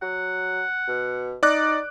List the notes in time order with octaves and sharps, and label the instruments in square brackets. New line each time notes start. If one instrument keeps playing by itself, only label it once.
[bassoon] F#3 [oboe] F#5
[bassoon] B2
[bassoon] D#4 [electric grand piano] D5 D6 F#6